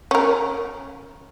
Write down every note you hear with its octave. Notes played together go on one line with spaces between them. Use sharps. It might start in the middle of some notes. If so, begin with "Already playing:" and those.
C#4 A#4